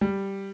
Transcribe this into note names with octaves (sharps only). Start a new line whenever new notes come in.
G3